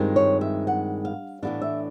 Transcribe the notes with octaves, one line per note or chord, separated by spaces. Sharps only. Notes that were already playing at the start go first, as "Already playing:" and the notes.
Already playing: G2 D#3 G#3 C4 F4
C#5
E5
F#5
F5
A2 E3 G#3 B3 D4 F5
E5